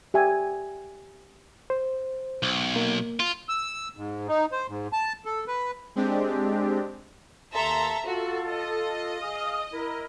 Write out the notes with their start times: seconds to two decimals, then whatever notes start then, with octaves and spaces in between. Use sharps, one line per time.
0.14 G4 E5 G#5
1.70 C5
2.43 B1
2.76 A#3
3.20 F4
3.49 E6
3.97 G#2
4.28 D#4
4.52 C5
4.69 G#2
4.93 A5
5.25 A4
5.47 B4
5.95 G#3 C4 D4 G4
7.54 D#2 D#3 A4 E5 A#5 C6
8.06 F4 F#4 A4
8.50 D#5
9.21 G#4 F5 D#6
9.73 E4 A#4